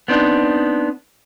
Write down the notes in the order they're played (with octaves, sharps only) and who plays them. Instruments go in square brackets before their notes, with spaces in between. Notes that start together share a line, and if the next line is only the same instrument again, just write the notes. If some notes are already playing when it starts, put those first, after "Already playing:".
[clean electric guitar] B3 C4 D4 D#4